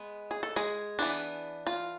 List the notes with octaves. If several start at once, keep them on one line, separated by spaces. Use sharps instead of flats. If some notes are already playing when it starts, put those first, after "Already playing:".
Already playing: G#3 B3
G#4
A4
G#3 G#4
E3 B3 D4
F4